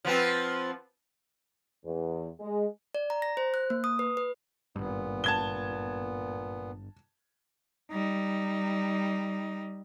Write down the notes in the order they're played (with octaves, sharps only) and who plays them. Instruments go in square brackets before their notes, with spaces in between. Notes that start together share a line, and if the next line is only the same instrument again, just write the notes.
[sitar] F3 B3 C4
[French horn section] E2
G#3
[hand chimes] D5
A#5
A#6
C5
F#6
A#3
D#6
B4
B4
[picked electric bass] G#1 G2 [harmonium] A#2 B3
[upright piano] A5 G#6 G7
[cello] G3 D#4